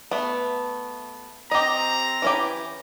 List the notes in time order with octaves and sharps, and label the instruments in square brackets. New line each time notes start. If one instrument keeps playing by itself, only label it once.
[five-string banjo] A3 B3
[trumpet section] C4 A#5 [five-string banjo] G4 D#5
[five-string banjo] E3 C#4 G4